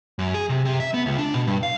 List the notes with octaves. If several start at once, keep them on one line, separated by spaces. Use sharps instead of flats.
F#2
G#4
C3
C3
E5
B3
C#2
D4
B2
G2
F5